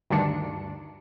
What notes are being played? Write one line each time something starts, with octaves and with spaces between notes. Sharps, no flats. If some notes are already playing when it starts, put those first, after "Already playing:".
D2 G2 D#3 D4 C#7